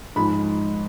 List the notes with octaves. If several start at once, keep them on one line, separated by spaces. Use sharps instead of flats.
G#2 F3 G#3 B5